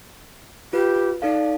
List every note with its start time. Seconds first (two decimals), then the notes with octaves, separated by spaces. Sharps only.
0.73 F4 G4 B4
1.22 D#4 A4 D5 F5